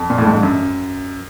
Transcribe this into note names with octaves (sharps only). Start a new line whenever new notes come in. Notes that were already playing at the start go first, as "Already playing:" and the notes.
Already playing: F2
A#2
A2
G#2
G2
F#2